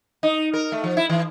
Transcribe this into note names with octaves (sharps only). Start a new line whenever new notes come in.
D#4
A#4
A3
F3
E4
E3